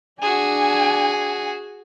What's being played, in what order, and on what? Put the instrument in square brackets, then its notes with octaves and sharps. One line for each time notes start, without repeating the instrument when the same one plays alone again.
[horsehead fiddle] D4 G#5 [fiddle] F#4 G#4